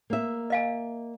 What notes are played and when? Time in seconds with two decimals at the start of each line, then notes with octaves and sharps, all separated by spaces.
0.10 A#3 E5
0.50 D#5 F5 G#5